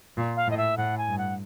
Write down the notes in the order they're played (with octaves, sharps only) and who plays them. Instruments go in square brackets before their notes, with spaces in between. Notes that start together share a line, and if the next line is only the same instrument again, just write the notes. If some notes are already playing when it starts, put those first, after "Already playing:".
[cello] A#2
[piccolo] F5
[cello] A2 [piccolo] D#5
[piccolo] E5
[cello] A2 [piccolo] F#5
[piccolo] G#5
[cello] G2
[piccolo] F#5